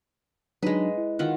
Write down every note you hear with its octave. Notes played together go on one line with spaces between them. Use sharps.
F#3 G#3 D4 D#4 B4
E4
D#3 F4 F#5